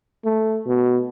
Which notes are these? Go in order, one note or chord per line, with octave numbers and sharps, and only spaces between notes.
A3
B2